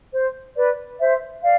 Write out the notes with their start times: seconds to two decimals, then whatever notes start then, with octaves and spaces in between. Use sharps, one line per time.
0.11 C5
0.56 B4 D5
0.99 C5 E5
1.43 D5 F5